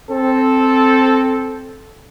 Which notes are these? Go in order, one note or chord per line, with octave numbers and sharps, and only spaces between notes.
C4 A4